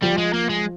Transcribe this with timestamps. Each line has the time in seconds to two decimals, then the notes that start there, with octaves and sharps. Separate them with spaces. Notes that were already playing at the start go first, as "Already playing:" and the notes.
0.03 F3 G3
0.18 G#3
0.33 A#3
0.49 G#3